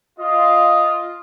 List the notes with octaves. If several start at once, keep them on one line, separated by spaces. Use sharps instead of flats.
F4 D#5